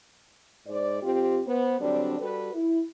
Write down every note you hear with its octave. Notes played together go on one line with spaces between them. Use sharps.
G#2 C5 D5
F2 C4 F4 G4
B3 C5
D3 F#3 G3 C4 D4
G3 F#4 G4 A4 B4
E4